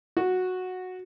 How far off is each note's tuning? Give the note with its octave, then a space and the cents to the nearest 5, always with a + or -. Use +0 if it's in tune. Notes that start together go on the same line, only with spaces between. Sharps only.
F#4 -10